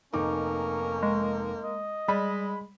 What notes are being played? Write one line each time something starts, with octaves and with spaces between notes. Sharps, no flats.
F1 A#3 C#4 D#4 D6
G#3
D#5
G3 G#3 B5